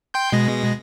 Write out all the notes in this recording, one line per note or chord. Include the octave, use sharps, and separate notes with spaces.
G5 C6 G6
B2 G#3 A#6